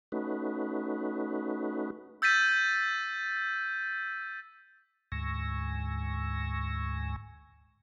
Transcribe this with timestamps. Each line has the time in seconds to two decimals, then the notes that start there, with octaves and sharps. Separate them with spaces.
0.12 A3 C#4 D#4 F#4 B4
2.22 E6 G6 A6 B6 D#7
5.12 D2 G#2 G#5 C#6 E6 A#6